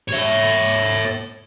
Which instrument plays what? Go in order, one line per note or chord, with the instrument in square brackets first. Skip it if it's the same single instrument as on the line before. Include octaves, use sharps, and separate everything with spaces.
[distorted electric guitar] C#5 E5